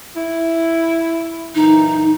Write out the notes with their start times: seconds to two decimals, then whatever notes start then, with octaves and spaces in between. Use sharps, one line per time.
0.16 E4
1.55 F#2 A#2 E3 D#4